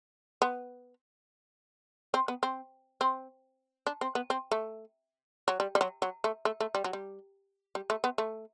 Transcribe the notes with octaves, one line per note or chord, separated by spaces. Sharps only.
B3
C4
B3
C4
C4
D4
C4
B3
C4
A3
F#3
G3
G3
F#3
F#3
A3
A3
A3
G3
F#3
G3
G3
A3
B3
A3